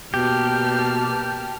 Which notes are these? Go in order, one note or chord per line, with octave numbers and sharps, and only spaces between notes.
B2 A#3 G4 A5 F6